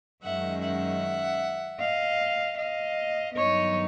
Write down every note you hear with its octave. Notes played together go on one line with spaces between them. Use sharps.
F#2 D#3 G#3 C#4 E5 F#5
E5 F#5
D#5 F5
D#5 F5
G2 D#3 F#3 B3 D#4 C#5 D#5